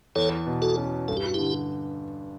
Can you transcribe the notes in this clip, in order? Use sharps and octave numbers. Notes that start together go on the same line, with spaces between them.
E2 A4 C#5
B2
F#4 A4
C#4
G2 A4
G4
F#4
D3 E4 G4